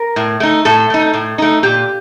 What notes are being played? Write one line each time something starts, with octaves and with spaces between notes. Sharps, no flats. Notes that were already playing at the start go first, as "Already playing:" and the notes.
Already playing: A#4
A2
A3 D#4
A2 A4
A3 D#4
A2
A3 D#4
A#2 G4